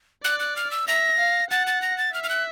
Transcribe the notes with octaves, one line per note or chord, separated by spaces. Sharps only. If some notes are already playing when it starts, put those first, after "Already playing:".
D5 F#6
F#6
F6
E6
E5 A#6
F5
F#5 A6
A6
A#6
A6
E5 F6
F6
F#6